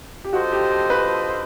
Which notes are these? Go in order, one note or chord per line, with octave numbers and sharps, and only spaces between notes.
G4
D4 F4 F#4 A4 C5 D#5
G4
G4
B4